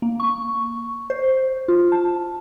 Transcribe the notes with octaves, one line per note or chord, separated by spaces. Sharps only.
A#3
C#6
C5
F4
A5